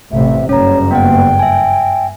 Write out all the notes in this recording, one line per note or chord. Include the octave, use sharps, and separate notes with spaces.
A1 C3 E5
F#1 G2 C#4 C#5 A#5
A#3 B3 F#5 G5
E5 G#5